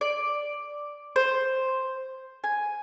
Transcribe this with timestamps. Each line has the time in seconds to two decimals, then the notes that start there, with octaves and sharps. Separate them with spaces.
0.01 D5
1.16 C5
2.44 G#5